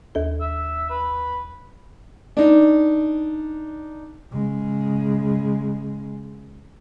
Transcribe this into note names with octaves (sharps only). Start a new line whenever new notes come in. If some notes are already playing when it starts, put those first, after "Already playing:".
D#2 A4
E5
B4
D4 D#4
C#3 G#3